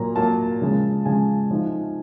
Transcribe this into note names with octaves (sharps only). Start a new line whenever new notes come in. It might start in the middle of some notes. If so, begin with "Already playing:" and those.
Already playing: A#2 F#3 A#3 A#5
A#2 F#3 A#3 A5
C#3 F3 G#3
C#3 F3 G#3 G#5
C3 F3 A3 C4 D#4